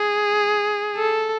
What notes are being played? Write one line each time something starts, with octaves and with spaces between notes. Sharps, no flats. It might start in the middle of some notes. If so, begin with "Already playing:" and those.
Already playing: G#4
A4